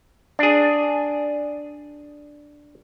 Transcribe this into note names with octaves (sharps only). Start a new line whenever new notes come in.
D4 G#4